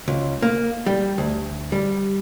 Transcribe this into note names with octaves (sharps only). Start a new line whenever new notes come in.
C#2
A#3
G3
D2
G3